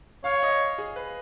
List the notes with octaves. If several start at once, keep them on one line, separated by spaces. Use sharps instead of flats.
C#5 F5
D#5
G#4
B4